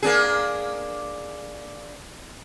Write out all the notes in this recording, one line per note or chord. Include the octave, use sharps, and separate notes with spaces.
A#3 D4 G#4